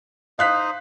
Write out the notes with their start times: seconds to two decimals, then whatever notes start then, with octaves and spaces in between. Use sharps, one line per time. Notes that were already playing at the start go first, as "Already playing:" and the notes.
0.39 D#4 C5 D#5 F5 F#6 B6